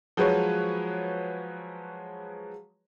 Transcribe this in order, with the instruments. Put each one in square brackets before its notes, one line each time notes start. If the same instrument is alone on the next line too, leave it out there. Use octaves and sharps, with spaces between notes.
[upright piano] F3 F#3 G#3 G#4 B4 C#5